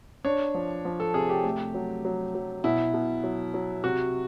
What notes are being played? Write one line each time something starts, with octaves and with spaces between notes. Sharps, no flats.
D4 C#5
F3
F3
A4
C3 G#4
G4
A3
F#3
F#3
F#3
B2 E4
B2
F#3
F#3
C3 F#4